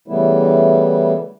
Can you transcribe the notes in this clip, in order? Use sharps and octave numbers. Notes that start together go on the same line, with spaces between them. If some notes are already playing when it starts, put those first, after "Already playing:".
C#3 E3 G3 A3 B3 E4